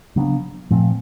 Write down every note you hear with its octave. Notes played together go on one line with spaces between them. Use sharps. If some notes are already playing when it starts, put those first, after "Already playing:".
C#3 F#3 B3 D4
A#2 F3 A3 C4